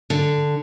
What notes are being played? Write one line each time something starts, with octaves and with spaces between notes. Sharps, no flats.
D3